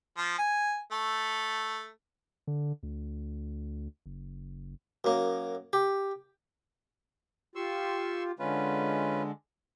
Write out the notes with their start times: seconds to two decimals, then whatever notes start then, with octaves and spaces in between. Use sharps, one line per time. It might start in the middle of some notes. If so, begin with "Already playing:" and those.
0.17 F3
0.39 G#5
0.92 A3
2.47 D3
2.83 D2
4.06 F#1
5.04 F#2 A#3
5.73 G4
7.55 F4 G4 C6 C#6 E6
8.39 D3 G#3 C#4 F4 B4